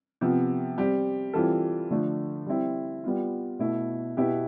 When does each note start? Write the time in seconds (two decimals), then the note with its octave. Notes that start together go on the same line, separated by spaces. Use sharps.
0.21 C3 F3 B3
0.78 G3 C4 G4
1.33 E3 G3 C4 F4 A4
1.91 D3 F3 A3
2.46 G3 C4 E4
3.04 G3 B3 F4
3.59 B2 A3 E4
4.17 B2 B3 E4 G4